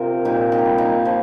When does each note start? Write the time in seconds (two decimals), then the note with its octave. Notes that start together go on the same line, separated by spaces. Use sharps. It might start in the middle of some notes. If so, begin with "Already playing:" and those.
Already playing: C3 F4 G4 A#4
0.25 A#2 D#4 G4
0.52 D#4 G4
0.65 G3
0.78 A#3 D#4
1.05 F3